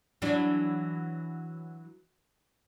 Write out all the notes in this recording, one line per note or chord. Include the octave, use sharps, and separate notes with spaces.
E3 F#3 D4